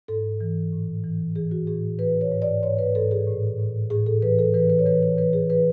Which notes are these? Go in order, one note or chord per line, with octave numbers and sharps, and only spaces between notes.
G#2 A4
E3
A2
E3
E3 G#4
F#4
A2 G#4
E3 B4
C#5
G#2
D5
G#2 C#5
B4
G#2 A4
G#4
A2
A2
A2 G#4
A4
E3 B4
A4
E3 B4
B4
C#5
E3 B4
C#5
E3 B4
G#4
E3 B4